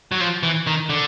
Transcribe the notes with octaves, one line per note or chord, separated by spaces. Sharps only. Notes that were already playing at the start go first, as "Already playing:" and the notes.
F#3
F3
E3
D#3
D3